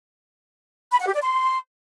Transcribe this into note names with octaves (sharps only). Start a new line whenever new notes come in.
B5
F#5
G4
D5
C6